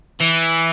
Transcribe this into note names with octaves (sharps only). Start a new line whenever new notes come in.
E3